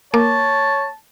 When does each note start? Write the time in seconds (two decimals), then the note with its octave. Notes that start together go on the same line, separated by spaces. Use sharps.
0.14 A#3 A#4 C#5 A5 D6